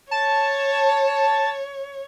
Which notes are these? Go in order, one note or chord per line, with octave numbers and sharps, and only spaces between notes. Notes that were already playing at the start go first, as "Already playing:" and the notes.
C#5 A5